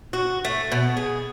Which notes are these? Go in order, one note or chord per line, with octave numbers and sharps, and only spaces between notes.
F#4
A3
B2
G#4